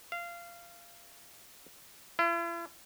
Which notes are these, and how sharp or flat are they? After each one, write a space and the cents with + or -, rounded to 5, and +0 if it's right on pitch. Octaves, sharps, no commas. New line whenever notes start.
F5 -20
E4 +45